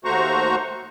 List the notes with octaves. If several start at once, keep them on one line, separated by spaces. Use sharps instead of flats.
D#2 A3 F#4 C5 A#5 C#6